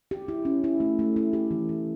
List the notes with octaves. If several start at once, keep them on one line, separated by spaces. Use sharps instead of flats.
G4
E4
C#4
E4
A3
A3
E4
G4
E3
E3